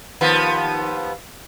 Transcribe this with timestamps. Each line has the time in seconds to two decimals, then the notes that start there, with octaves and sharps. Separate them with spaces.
0.21 D#2 F3 B3